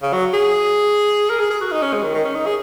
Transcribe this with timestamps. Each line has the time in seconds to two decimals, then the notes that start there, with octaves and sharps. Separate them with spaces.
0.02 C#3
0.13 F#3
0.34 G#4
1.30 A#4
1.40 G#4
1.50 G#4
1.61 F#4
1.71 D#4
1.82 C#4
1.93 G#3
2.03 D#3
2.14 D#3
2.25 C#4
2.35 D#4
2.46 G#4